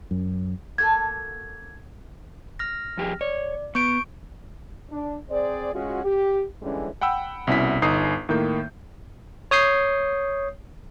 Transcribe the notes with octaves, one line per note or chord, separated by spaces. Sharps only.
F#2
A#3 F#4 A4 G#6
F6 A#6
F2 G4 G#4
C#5 D5
B3 C#6 G6 D7
D4
C4 G#4 C5 D5
G#3 C#4 F4 F#4
G4
D3 E3 G3 G#3 C#4
F#5 G5 B5 E6
C2 B2 C#4 E4 B6
G1 D#4 D#6 C7
A2 D#3 A#3 G6
C#5 D#6 G6 C7